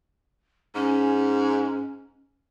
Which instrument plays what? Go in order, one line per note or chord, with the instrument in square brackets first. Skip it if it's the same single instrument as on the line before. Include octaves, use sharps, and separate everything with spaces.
[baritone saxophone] G#2 [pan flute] C#4